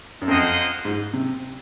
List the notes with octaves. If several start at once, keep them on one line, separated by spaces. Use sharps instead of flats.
F#2
F2 A#3 F4 C5 D#5 F#5
G#2
C3